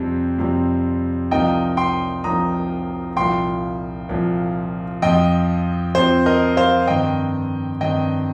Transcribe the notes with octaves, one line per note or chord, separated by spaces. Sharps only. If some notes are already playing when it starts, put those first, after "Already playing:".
Already playing: F2 C3 G3 C4
F2 C3 G3 C4
C2 C3 F3 A#3 D#4 D#5 G5
G5 C6
C2 C3 F3 A#3 D#4 A#5 D#6
C2 A#2 F3 G5 C6
C2 A#2 F3
F2 F3 C4 D#5 G5
F2 F3 C4 C5
A#4 D#5
C5 F5
G2 D#3 C4 D#5 G5
G2 D#3 C4 D#5 G5